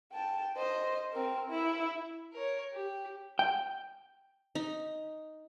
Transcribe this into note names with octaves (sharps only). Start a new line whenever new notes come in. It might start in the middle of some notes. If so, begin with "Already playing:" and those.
G5 A5
C5 D#5
C4 A#4
E4
A#4 C#5
G4
G5
D#4